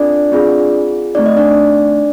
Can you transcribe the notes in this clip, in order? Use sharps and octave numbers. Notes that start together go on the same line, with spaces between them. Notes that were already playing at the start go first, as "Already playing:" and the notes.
Already playing: C4 D4 F4 A4 D5
C4 F4 G#4
A3 C4 D#4 D5
D#5
D4 D5